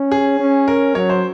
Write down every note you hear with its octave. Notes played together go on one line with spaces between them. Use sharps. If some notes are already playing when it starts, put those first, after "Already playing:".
Already playing: C#4
G#4
C#4
A#4
F#3 C#5
C5